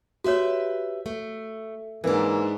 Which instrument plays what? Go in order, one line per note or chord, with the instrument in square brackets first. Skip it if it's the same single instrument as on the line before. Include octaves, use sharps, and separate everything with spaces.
[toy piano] F#4 C#5 [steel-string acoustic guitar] G4 B4 E5
[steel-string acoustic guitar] A3
[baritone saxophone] G#2 [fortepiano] E3 A#3 [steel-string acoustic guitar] D4 A#4